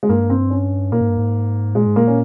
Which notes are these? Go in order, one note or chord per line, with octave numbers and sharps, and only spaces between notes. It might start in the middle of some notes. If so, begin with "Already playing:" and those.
G#3
G2 A#3
C4
C#4
A#2 A#3
G#2
G2
G#2
A#2 G#3
G#2
A#2 A#3
C#4